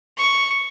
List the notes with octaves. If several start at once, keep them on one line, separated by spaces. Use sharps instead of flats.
C#6